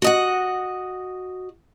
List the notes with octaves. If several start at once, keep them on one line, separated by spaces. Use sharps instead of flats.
F#4 D#5 F#5